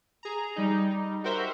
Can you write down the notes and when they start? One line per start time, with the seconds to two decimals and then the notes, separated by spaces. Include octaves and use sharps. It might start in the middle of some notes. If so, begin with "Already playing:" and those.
0.23 G#4 A#5
0.56 G3 D#4
1.24 F#4 G4 A#4 C5 E5